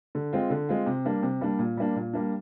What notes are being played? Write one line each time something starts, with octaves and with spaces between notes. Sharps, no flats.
D3
G#3 C4 F4
D3
G#3 C4 F4
C3
G3 A#3 D4
C3
G3 A#3 D4
A#2
G3 A#3 D4
A#2
G3 A#3 D4